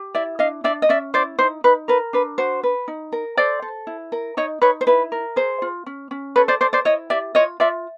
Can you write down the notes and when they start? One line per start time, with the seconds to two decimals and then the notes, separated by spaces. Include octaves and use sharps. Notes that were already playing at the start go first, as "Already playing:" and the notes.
Already playing: G4
0.15 E4 D5 E5
0.39 D4 D#5 F5
0.64 D4 D5 E5
0.82 D#5
0.89 C#4 D5 E5
1.14 E4 C5 D5
1.39 D#4 C5
1.64 D#4 B4
1.88 A#4 B4
2.13 D4 B4
2.38 F#4 C5
2.63 B4
2.88 D#4
3.12 A#4
3.37 A4 C5 D5
3.62 A4
3.87 E4
4.12 A#4
4.37 D#4 C#5 D#5
4.62 D#4 B4 C#5
4.81 C5
4.87 E4 B4
5.12 A#4
5.36 G#4 C5
5.62 F4
5.86 C#4
6.11 C#4
6.36 A4 B4 C#5
6.48 C5 D5
6.61 A4 C5 D5
6.73 C5 D5
6.85 E4 C#5 D#5
7.10 G4 D5 E5
7.35 F4 C#5 D#5
7.60 F4 D5 E5